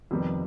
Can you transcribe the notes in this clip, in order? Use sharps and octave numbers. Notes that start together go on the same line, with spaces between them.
F2 C3 D#3 G3 B3